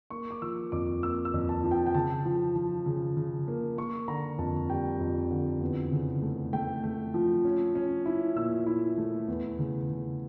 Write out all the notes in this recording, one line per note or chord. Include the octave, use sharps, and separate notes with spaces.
A#3 C#6
D6
F3 E6
F2 D6
A#3 E6
E6
F2
A5
F3
G5
G5
C#3 A5
F3
F3
C#3
C#3
A#3
A#3 C#6
D3 A#5
F2 A5
G3 G5
F2
D3
E2
C#3
A3
A3 G5
A3
F3
C#4
C#4
E4
A#2 E6
E4
A3
E2
C#3
C#3